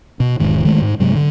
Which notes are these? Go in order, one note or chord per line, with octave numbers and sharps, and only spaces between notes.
B2
E1 G#2 D#3
D#3 G#3 A3
G#2
G2 C3 F#3 G#3
D3